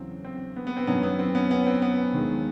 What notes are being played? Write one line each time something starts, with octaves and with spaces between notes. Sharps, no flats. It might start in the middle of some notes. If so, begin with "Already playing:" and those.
Already playing: E2 C#3 F#3 C4
C4
B3
B3
C4
F#2 D#3 F#3 B3 C#4
B3
C4
B3 C#4
B3 C#4
C4
B3
D#2 D#3 G#3